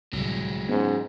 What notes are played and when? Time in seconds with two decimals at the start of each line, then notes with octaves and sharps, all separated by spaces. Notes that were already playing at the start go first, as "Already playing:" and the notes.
0.13 D1 C2 F#3 G#3
0.69 G#2 B3 C#4